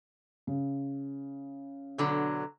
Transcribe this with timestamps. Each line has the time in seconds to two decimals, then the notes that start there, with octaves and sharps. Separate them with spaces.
0.47 C#3
1.98 B2 D3 F#3